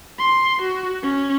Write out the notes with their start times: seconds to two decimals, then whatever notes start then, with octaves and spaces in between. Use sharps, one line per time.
0.19 C6
0.62 F#4
1.02 C#4